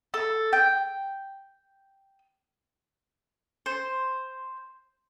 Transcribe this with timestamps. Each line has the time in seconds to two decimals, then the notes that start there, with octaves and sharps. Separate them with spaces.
0.14 A4
0.53 G5
3.66 C5